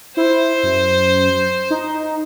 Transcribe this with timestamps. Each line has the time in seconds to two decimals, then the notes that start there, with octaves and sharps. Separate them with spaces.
0.17 E4 C5
0.63 F#2
1.70 D#4